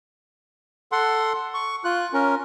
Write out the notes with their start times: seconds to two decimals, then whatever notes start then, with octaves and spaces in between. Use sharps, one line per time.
0.92 A4 F#5 C6
1.54 C#6
1.84 F4 F#6
2.14 C#4 A#4